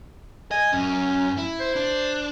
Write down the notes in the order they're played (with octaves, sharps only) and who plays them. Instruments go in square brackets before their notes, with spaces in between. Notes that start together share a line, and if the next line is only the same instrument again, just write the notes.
[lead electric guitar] D#5 [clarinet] G#5
[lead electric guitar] F#2 [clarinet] C#4
[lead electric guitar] E4
[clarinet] C5
[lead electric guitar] D4